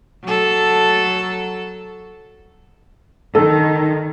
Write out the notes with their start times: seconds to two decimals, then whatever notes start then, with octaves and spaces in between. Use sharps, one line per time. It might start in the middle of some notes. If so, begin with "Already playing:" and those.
0.24 F#3 A4
3.35 D#3 A4